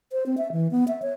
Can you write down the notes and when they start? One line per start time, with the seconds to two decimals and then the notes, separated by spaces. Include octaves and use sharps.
0.12 C5
0.26 C4
0.38 E5
0.52 E3
0.71 B3
0.88 E5
1.02 C#5